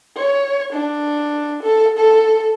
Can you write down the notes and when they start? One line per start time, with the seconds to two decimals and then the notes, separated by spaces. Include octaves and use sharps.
0.17 C#5
0.73 D4
1.63 A4
1.98 A4